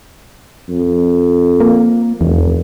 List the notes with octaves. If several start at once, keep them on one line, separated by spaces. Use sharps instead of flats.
F2
A#3
F1 E2